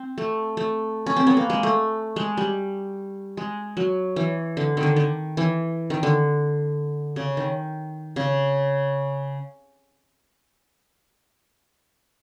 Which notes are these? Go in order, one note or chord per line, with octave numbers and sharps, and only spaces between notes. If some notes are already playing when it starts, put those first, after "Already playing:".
Already playing: C4
A3
A3
C#4
C4
B3
A#3
G#3
A3
G#3
G3
G#3
F#3
E3
D3
D#3
D3
D#3
E3
D#3
D3
C#3
D#3
C#3